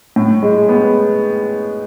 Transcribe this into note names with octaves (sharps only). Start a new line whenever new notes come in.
A2
G#3
B3